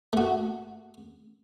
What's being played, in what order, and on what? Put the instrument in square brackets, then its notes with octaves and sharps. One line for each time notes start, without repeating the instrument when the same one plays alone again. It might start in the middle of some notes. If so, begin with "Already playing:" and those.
[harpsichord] A3 F#4